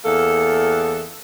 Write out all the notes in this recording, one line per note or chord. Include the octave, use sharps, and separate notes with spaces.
E2 A#3 A4